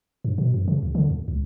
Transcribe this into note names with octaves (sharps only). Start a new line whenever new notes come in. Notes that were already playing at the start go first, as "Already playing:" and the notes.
G2
B2
F#2
C#3
D2
D3
D#2
C#2